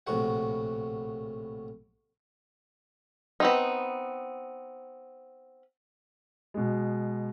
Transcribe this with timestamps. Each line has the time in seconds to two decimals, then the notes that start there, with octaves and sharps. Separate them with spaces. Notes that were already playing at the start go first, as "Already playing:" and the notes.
0.07 A#1 A2 C3 F#4 F#5
3.40 B3 C4 D#4
6.54 B2 G#3